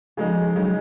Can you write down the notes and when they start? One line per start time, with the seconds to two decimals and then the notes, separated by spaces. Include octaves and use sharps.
0.17 C#3 F3 G#3 D#4
0.56 C#3 F#3 G#3 D#4